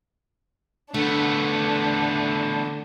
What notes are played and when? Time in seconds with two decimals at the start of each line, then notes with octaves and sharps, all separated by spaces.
0.94 D3 A3 B3 D4